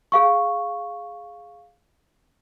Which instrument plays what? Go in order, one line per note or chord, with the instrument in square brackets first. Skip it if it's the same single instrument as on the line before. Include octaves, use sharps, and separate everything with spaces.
[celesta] G#4 F5 C#6